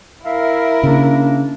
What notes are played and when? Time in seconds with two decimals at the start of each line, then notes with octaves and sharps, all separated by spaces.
0.24 E4 A#4 E5 F5
0.83 C#3 A#3 D4